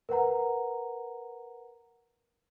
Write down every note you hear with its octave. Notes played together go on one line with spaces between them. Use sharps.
A#4 B4 F#5 A#5